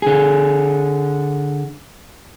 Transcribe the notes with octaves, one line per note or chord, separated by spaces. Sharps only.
D3 G#4